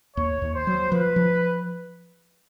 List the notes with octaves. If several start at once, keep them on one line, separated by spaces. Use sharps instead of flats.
D#2 C#5
D#2
C5
F#3
F3 B4
F3